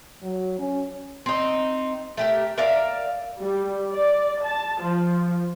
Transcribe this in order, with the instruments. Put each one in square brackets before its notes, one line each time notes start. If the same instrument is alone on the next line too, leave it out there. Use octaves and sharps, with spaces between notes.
[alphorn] F#3
C#4
[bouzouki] C4 D#4
A3 G4 A#4
A#4 D5 E5 F5
[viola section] G3
D5
A5
F3